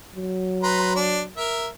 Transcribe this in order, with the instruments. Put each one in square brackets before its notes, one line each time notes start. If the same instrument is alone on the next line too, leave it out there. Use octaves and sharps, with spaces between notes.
[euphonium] F#3
[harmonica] B4 A#5 C6
D4
A#4 E5